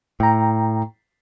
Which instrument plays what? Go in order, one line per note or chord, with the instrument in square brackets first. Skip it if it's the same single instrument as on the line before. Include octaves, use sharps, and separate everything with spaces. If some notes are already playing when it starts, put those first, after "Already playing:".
[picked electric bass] A2 [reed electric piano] G5 A#5